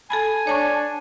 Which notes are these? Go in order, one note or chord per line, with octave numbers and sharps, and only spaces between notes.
A4 G#5 A5 B5
D4 C#5 A5 C#6